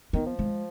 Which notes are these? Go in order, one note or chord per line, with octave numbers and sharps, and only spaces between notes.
D#3 B3
F3
G#3